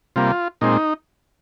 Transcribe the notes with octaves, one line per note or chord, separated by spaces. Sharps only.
C3 G3 A#3 F4
A#2 G#3 C4 D#4